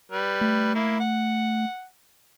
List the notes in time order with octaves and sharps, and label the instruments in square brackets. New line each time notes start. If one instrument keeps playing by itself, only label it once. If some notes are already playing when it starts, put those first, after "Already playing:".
[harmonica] G3 B4
[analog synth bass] A3
[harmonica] A#3 E4
F#5